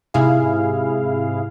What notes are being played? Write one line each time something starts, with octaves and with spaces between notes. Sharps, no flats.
G#2 C3 E4 G#4 F5